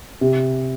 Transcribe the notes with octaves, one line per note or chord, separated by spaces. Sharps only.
C3